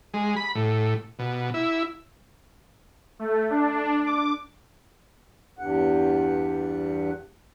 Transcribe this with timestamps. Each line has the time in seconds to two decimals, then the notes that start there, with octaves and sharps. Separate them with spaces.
0.14 G#3
0.36 B5
0.55 A2
1.19 B2
1.54 E4
3.19 A3
3.50 D4
4.06 D6
5.58 E2 G2 F#5